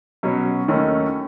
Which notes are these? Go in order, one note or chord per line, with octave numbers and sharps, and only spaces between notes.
B2 F#3 C#4
D#2 D#3 A3 C#4